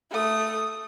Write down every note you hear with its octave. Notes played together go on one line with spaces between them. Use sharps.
A3 D#6